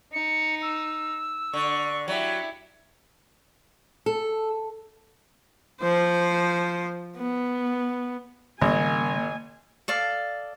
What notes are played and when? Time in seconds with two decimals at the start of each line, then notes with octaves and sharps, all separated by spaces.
0.13 D#4 C#7
0.62 E6
1.53 D3 C#6
2.08 F#3 E4 G4
4.06 A4
5.81 F3 C5
7.17 B3
8.62 G#1 C#3 G3 A3 A#3 G#5
9.88 A4 D5 F5